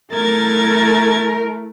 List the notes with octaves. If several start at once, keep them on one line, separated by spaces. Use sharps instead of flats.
A3 E4 A#4 G#6 A6